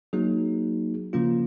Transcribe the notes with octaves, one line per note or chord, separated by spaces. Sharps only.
F#3 A#3 D#4 G#4
C#3 F3 A#3 C#4 F4